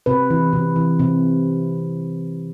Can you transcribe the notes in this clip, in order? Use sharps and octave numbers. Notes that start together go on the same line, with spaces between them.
C3 B4
E3
C3
E3
C3